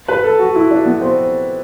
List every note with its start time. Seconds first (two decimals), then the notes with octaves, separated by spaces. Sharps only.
0.08 B4
0.24 A4
0.39 F#4
0.55 E4
0.71 D4
0.86 B3
1.01 C4